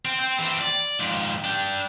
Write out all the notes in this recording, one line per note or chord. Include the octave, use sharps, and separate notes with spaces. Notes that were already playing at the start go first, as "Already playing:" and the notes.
C4
C4
E3 C4
D5
F2 G#2
D4 G5